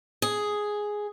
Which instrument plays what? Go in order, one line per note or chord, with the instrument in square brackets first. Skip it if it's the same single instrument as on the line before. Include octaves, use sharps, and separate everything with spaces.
[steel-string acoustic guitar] G#4